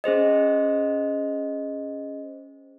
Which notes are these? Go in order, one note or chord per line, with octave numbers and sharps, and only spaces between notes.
C#4 G#4 C5 D#5